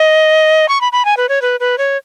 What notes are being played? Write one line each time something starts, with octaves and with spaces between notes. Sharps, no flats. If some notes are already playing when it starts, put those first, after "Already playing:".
Already playing: D#5
C#6
B5
B5
G#5
B4
C#5
B4
B4
C#5